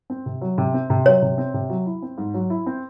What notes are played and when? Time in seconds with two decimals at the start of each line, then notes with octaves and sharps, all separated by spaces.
0.10 C4
0.26 C3
0.41 F#3
0.58 C3
0.74 C4
0.90 C3
1.06 F#3 C#5
1.22 C3
1.38 C4
1.54 C3
1.70 F#3
1.86 E4
2.02 C4
2.18 G#2
2.34 F#3
2.50 E4
2.66 C4